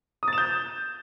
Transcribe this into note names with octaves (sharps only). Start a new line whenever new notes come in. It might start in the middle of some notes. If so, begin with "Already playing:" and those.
D#6
A6
E7
G6